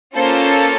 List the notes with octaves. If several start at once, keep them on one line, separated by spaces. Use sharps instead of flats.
A#3 C#4 F4 A4 C5